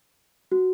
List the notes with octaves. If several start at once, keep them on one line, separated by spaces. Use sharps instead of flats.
F#4